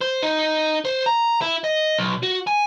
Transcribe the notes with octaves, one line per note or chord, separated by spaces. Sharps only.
C5
D#4
C5
A#5
E4
D#5
B1
F#4
G#5